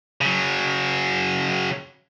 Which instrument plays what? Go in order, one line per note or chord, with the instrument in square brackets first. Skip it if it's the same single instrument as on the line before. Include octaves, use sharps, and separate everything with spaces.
[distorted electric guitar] C#3 F#3